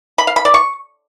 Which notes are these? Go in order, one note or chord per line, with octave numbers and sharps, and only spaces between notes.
B5
F5
B5
D5
C#6